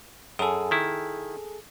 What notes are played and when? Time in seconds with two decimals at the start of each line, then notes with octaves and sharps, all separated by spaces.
0.39 F#2 G#4 A4
0.71 D#3 E4